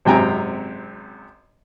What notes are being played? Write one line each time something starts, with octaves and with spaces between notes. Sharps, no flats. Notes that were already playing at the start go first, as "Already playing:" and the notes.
G#1 F#2 C3 G5 G#5 A#5